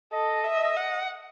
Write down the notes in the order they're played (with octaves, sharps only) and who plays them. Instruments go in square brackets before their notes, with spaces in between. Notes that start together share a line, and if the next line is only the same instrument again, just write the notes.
[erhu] A4 [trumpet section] D#5
[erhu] E5
F#5